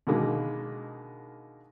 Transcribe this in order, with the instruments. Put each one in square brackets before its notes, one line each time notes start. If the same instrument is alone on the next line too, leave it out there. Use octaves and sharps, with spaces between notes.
[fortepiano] B2 D3 D#3 G#3 A#3